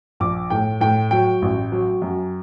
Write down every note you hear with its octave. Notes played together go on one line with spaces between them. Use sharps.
A#1 D6
A2 G5
A2 G5
F#3 G5
A1
F#3
F#2